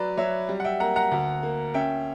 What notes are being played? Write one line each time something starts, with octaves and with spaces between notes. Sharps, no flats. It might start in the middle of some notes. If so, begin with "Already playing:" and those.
Already playing: F#3 B4 D5
F#3 C#5 E5
G3
F#5
E5 G5
A#3 F#5 A#5
F#5 A#5
D2
A#3
C#4 E5 G5